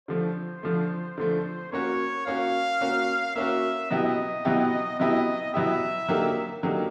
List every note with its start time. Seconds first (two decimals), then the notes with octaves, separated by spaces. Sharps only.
0.08 D3 F3 A3 C5
0.63 D3 F3 A3
1.18 D3 F3 A3
1.72 A#3 C#4 F#4 C#5
2.27 A#3 C#4 F#4 F5
2.81 A#3 C#4 F#4
3.35 A#3 C#4 F#4 E5
3.90 B2 F#3 B3 E4 G4 D#5
4.45 B2 F#3 B3 E4 G4
4.99 B2 F#3 B3 E4 G4 D#5
5.54 B2 F#3 B3 E4 G4 E5
6.09 D3 F#3 A#3 D#4 G4
6.63 D3 F#3 A#3 D#4 G4